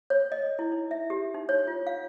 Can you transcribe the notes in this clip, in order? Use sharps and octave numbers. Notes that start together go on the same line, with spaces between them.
C#5
D#5
E4
D#4
E5
G4
D#4
C#5
F4
F5